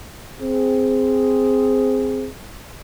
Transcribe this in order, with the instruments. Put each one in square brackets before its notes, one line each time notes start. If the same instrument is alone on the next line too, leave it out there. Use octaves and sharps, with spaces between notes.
[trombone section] C4 G#4